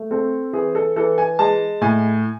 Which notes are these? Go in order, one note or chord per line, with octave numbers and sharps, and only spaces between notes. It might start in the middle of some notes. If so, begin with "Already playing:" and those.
Already playing: A3
C4 A4
E3 G#4
A4
E3 A4
G#5
G#3 A5
A2 G#5